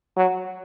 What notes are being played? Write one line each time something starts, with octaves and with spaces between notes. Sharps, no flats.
F#3